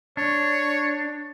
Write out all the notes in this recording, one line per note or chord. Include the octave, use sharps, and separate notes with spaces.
D4 C#5